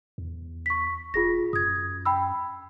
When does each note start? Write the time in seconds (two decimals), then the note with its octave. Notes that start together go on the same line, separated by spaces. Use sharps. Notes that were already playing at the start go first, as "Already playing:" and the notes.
0.18 E2
0.66 C#6 B6
1.14 E1 F4 G#4 A#6
1.53 F#2 D#6 G#6
2.05 G5 B5 E6